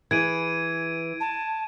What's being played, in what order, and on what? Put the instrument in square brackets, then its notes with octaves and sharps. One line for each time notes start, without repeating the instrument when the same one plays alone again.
[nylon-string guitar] E3 G#4 [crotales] G#6 D7 D#7
[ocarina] A5